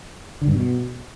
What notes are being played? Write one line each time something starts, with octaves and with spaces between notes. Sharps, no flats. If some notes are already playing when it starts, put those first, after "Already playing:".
D3
G2
B2